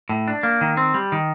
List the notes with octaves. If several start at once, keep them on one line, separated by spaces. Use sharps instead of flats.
A2
D4
A#3
D#3
C4
G3
D#3